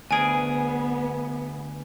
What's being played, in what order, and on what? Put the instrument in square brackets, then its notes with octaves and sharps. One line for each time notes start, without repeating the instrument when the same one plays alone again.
[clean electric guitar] D2 G#4 [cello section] B3 [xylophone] G#5 D7